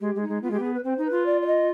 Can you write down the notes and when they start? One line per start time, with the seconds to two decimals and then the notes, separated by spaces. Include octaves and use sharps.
0.01 G#3 G4
0.15 G#3
0.22 D#4
0.29 G#3
0.42 B3 F4
0.51 G#3 G4
0.60 B3 G#4
0.74 B4
0.84 C4 C5
0.98 D#4
1.05 B4
1.12 F4
1.26 D5
1.42 D5
1.46 D#5